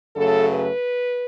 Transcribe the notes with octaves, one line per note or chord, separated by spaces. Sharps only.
F#2 C#3 F#3 A3 A4
B4